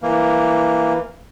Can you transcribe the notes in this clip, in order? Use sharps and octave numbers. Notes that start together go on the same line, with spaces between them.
E3 A#3